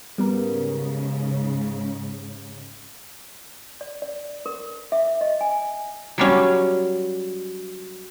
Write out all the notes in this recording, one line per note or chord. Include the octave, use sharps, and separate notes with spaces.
G#2 C#3 G3 B3 A#4
D5
D5
A#4
E5
D#5
G#5
F#3 G3 C#4